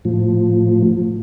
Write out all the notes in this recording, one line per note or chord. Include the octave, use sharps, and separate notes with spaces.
A2 F3